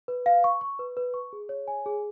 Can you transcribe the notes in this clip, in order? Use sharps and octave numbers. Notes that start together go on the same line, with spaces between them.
B4
F5
C#6
C#6
B4
B4
C#6
G#4
C#5
G#5
G#4